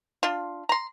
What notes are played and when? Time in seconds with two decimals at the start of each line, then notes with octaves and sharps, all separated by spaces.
0.23 D4 F4
0.69 A#5 C6